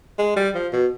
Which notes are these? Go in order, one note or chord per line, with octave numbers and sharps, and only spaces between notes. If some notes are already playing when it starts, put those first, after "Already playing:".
G#3
G3
F3
B2